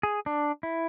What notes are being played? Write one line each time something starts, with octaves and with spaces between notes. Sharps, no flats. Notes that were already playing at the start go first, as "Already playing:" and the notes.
G#4
D4
E4